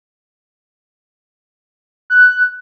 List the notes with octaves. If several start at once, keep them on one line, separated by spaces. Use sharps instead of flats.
F#6